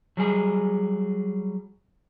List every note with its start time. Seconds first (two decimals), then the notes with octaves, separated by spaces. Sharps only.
0.17 F#3 G3 G#4